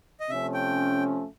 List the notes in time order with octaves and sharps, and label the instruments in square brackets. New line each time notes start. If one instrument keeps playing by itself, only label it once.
[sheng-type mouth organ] D#5
[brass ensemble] C3 F3 A3 C#4 [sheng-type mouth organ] E5
[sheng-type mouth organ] G5